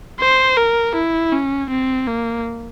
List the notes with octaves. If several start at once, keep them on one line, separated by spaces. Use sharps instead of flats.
C5
A#4
E4
C#4
C4
A#3